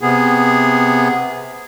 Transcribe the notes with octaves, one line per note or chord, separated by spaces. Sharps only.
C3 B3 G#4